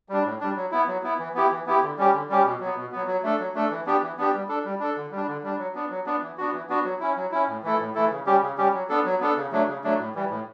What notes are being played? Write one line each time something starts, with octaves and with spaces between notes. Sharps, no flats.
G3 D4
A2
G3 D4
F#3
B3 E4
F#3
B3 E4
E3
B3 E4 G4
E3
B3 E4 G4
D3
G3 C#4 G4
D3
G3 C#4 G4
B2
F#3 B3
B2
F#3 B3
F#3
A3 D4 A4
F#3
A3 D4 A4
E3
B3 D4 G4
E3
B3 D4 G4
G3
D4 A4
G3
D4 A4
D3
G3
D4
D3
G3 D4
F#3
B3 D4
F#3
B3 D4
E3
B3 D4 F#4
E3
B3 D4 F#4
F#3
C#4 E4
F#3
C#4 E4
A2
E3 A3 E4 A4
A2
E3 A3 E4 A4
C#3
G3 C#4 G4
C#3
G3 C#4 G4
F#3
B3 D4 A4
F#3
B3 D4 A4
C#3
F#3 A3 D4
C#3
F#3 A3 D4
A2
E3 G3
A2